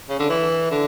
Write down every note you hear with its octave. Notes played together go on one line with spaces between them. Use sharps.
C#3
D3
E3
D3